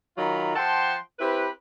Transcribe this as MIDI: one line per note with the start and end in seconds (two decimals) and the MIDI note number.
0.18 0.52 51
0.18 0.52 54
0.18 0.52 63
0.18 0.52 65
0.18 0.52 82
0.18 0.52 83
0.56 0.95 53
0.56 0.95 78
0.56 0.95 79
0.56 0.95 81
0.56 0.95 84
1.19 1.47 60
1.19 1.47 64
1.19 1.47 67
1.19 1.47 71